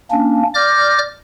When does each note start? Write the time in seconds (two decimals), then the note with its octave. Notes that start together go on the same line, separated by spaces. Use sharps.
0.11 A#3 C#4 D4
0.55 D5 D6 F6 G6 A#6